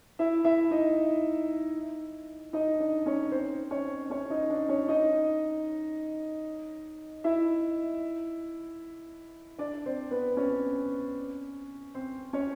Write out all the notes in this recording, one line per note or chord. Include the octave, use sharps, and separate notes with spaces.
E4 E5
E4 E5
D#4 D#5
D#4 D#5
D4 D5
C#4 C#5
C4 C5
C#4 C#5
C#4 C#5
D#4 D#5
D4 D5
C#4 C#5
D#4 D#5
E4 E5
D4 D5
C4 C5
B3 B4
C#4 C#5
C4 C5
C#4 C#5